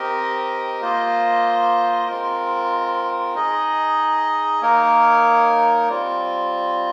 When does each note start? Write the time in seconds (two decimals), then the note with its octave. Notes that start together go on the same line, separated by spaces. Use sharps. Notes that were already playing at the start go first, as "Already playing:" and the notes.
Already playing: C4 G4 A#4 D#5
0.81 A#3 F4 C5 D#5
2.08 G#3 C4 F4 A#4
3.35 D#4 G#4 D#5
4.61 A#3 D#4 A#4 C#5
5.88 G3 C4 F4